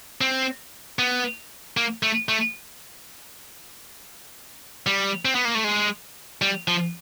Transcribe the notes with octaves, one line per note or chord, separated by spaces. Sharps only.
C4
B3
A#3
A3
A3
G3
C4
B3
A#3
A3
G#3
G3
F3